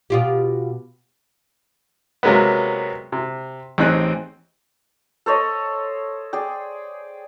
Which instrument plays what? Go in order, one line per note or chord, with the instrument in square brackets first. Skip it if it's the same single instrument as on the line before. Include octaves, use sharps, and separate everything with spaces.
[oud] B2 F4 G4
[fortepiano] C3 F#3 G#3 A#3 B3
C3
A1 C4 D#4 G#4 F#6
[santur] A4 C5 C#5 D#5
G#4 D5 G5